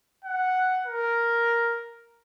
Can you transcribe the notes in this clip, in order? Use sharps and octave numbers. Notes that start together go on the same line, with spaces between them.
F#5
A#4